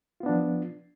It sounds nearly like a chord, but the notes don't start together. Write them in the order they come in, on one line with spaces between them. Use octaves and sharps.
F4 B3 D4 F3